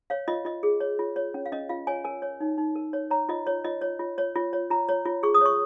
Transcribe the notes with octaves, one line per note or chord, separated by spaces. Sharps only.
C#5 F5
F4 D#5
F4 D#5
G#4
C#5
F4
C#5
C#4
F5
C#4 D#5
F4 F5
C#5 G#5
A#4 G#5
C#5
D#4
D#4
A#4
C#5
C#5 A#5
F4 D#5
C#5
F4 D#5
C#5
F4
C#5
F4
C#5
F4 A#5
C#5
F4
G#4 C#6
D#6
C#5 C#6